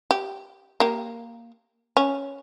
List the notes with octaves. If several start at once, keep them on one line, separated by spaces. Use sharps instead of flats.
G4
A#3 G4
C#4